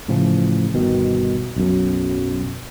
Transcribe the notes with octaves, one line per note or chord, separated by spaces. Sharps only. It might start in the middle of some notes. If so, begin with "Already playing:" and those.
A2 C#3 E3 F3
G1 B2 D#3
B1 F#2